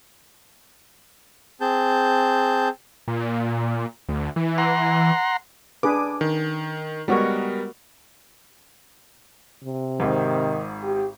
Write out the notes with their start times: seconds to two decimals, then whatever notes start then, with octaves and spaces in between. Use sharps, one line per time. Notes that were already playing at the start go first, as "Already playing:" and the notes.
1.61 C4 G#4 A5 G6
3.08 A#2
4.09 D2
4.36 E3
4.58 F#5 A#5 C6
5.83 D4 G#4 B4 D6
6.21 D#3
7.08 G3 G#3 B3 F#4 A#4 C#5
9.64 C3
10.00 G#1 G#2 D#3
10.83 G4